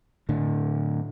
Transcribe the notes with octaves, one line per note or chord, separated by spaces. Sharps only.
A2 D3